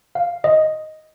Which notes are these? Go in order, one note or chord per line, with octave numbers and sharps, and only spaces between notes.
F5
D#5